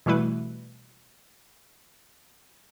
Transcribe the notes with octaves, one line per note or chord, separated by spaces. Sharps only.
B2 E3 G3 A3 E4 B4